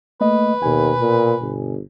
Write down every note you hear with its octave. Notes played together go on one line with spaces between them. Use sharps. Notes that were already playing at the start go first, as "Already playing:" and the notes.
A3 A#3 B4 D#5
D#2 B2 G#5
A#2
G1